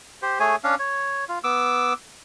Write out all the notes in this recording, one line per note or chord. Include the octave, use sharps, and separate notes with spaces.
G4 C5
A3 G#4 C#5 G#5
C#4 D4 F5
C#5
F4
B3 D6 E6